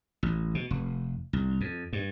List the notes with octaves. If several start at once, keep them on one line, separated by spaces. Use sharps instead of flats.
A1
B2
F1
C2
F2
G2